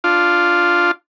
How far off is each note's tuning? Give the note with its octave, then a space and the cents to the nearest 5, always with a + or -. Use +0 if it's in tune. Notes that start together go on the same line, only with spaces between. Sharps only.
D4 +0 F4 +0